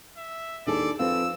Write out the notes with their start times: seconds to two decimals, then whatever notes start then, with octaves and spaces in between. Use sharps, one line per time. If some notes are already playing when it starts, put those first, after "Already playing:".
0.17 E5
0.67 D#2 D4 E4 G#4 A4 D5
0.99 F2 C4 A4 B4 F5 E6